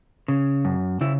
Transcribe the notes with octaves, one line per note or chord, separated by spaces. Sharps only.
C#3
F#2
C#3 E4